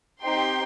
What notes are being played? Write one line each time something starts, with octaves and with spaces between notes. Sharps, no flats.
C4 D#4 G4 G5 C6